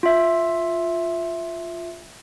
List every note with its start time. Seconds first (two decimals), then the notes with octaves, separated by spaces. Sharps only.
0.03 F4 E5